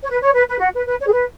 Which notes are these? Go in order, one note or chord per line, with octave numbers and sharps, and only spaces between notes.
C#5
B4
C#5
B4
B4
F#4
B4
B4
C#5
G#4
B4